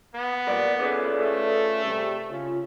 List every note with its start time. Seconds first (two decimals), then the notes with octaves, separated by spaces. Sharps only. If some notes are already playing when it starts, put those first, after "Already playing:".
0.15 B3
0.47 A#2 G3 A#4 D5
0.80 C#4 F4 G#4 A4 B4 D5
1.18 A3
1.84 C3 G3
2.30 C#3 C#4 F4